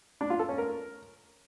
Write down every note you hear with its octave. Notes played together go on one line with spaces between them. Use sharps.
D4
F4
A4
C#4
A#4